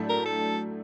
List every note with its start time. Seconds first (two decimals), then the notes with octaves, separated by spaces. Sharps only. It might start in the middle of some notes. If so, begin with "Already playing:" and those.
Already playing: A2 F#3 A3 D4
0.09 A#4
0.25 A4